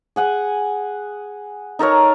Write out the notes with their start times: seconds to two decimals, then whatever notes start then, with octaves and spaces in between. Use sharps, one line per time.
0.16 G#4 F#5 G#5
1.79 D#4 A4 A#4 C#5